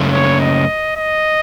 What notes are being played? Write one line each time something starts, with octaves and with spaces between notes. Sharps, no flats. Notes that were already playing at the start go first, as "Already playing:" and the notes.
Already playing: F#2 C#3 A3 C#4
C#5
D#5
D#5